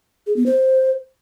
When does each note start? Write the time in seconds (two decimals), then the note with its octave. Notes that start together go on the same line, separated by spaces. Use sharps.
0.27 G#4
0.36 B3
0.46 C5